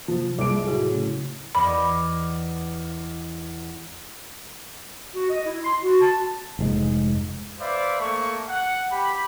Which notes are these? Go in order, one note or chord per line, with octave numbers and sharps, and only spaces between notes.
C3 F3 F#3
C2 G#3 D6 D7
A2 C#3 E4 F#4 G#4
A3 C#4
E2 D5 D#5 B5
F#4
D#5
E4
C6
F#4
A5
F1 G#2 G#3
B4 C5 D5 E5 F5
A3 A#3 C#6
F#5
G4 B5